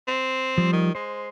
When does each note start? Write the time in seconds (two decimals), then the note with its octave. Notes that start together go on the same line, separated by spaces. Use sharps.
0.08 C4
0.58 F3 G3
0.73 D#3
0.95 G#3 C5